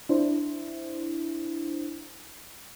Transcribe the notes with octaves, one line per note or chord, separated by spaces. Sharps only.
D4 E4 C5